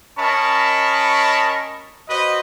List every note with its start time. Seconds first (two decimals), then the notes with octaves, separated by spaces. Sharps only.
0.18 C#4 A#4 D#5 A5 B5 C#6
2.09 F#4 B4 C5 D#5